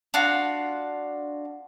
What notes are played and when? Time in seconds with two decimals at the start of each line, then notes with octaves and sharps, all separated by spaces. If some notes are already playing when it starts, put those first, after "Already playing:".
0.14 D4 F4 F#4